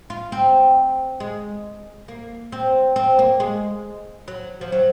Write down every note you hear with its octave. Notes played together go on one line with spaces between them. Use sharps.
F4
C4
G#3
A#3
C4
C4
A#3
G#3
F#3
F3
F#3